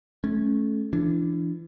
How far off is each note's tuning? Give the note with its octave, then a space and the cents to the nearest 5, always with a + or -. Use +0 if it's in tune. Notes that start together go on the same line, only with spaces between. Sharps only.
A3 -30 C#4 -10
E3 +35 D4 +0